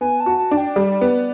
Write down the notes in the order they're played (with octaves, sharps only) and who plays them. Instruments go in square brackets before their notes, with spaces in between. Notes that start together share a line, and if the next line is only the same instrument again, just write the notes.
[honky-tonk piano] B3 [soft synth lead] G#5
[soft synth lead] A5
[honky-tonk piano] F#4
[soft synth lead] A5
[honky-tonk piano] D4
[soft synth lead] G5
[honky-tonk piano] G3 [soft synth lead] D5
[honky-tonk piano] B3